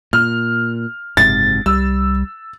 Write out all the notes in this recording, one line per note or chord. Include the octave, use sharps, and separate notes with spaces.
A#2 F6
F#1 G#2 C3 A6
C2 G3 E6